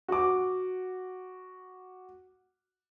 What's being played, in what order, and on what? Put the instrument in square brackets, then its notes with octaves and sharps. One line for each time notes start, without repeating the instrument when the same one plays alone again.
[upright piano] F#4 D6